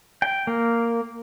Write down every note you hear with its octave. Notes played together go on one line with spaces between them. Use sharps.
G5
A#3